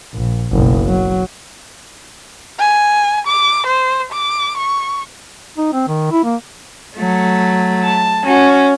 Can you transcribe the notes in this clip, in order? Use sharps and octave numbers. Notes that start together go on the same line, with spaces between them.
A#1
F#1 B1
F#3
G#5
D6
C5
D6
C#6
D#4
C4
D#3
E4
A#3
F#3 A3
A5
C#4 F#4